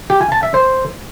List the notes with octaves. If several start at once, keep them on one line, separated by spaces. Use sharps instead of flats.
G4
G#5
A5
E5
C5